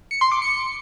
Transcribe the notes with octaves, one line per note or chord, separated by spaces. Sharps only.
C#7
C6
D6
C#7